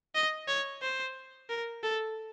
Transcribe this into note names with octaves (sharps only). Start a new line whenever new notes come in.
D#5
C#5
C5
A#4
A4